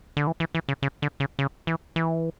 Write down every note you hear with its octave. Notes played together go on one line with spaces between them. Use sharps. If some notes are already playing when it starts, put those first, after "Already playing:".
D3
E3
E3
E3
C#3
C#3
D3
C#3
C#3
E3
E3